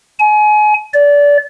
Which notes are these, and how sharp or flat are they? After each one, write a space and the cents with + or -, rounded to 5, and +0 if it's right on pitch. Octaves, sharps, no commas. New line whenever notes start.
G#5 +30
D5 -25